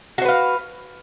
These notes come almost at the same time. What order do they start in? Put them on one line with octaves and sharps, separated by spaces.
F#4 C5 B4 F5